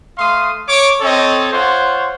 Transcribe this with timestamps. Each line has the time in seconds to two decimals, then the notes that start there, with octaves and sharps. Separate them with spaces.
0.18 A3 F5 C6 D#6
0.68 C#5 D6
1.01 C4 A4 C#5 D#5
1.52 F4 C5 C#5 F#5